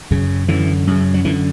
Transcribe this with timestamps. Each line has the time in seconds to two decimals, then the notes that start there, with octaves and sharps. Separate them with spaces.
0.11 F#2 C#3
0.48 F#2 D3 E3
0.87 F#2 C#3
1.14 F#3
1.25 F#2 D3 E3